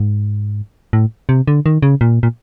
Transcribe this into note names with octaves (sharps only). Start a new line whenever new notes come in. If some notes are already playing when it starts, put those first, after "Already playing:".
Already playing: G#2
A2
C3
D3
D#3
C#3
A#2
A#2